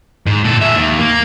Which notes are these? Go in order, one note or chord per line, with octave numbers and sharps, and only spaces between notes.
G#2
A#2 A4
G#4 E5
D#2
A#3